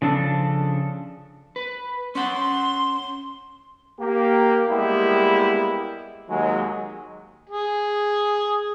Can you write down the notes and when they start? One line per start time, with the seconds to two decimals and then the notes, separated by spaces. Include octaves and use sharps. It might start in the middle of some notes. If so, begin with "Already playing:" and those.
0.02 C#3 F3 D4 A4
1.56 B4
2.15 C#4 F#5 C6
3.99 A#3 G4
4.68 G3 G#3 A#3 B3 E4 G4
6.30 D#2 F#3 G#3
7.49 G#4